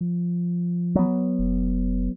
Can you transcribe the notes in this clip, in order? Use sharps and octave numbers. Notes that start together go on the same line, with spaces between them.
F3
F#3 B3
F1